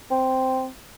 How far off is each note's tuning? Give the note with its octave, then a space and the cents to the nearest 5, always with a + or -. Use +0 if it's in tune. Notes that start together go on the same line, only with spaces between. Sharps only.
C4 -5